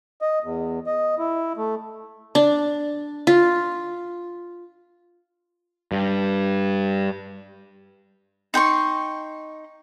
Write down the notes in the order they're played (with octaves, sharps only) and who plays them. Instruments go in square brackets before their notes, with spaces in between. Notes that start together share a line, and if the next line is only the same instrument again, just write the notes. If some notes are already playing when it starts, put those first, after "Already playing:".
[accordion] D#5
E2
D#5
E4
A3
[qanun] D4
F4
[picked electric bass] G2
[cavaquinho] D#4 G5 C6 C#6